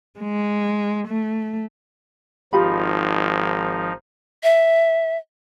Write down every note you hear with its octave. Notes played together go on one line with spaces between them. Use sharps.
G#3
A3
G#1 F3 D#4 F4 G4 B5
E5